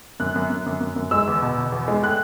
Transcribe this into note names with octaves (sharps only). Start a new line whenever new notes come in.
F#2 F#6
F#2
F#2
F#2
F#2
F#2
G#3 E6
E2
B2
B2
E2
G#3
A2 F#6